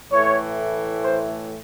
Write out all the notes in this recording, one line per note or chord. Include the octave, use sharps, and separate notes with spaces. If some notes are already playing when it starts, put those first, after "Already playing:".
A2 E3 A3 C#5
C5